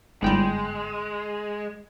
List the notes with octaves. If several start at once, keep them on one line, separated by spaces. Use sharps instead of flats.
G1 G#2 G3 G#3 G5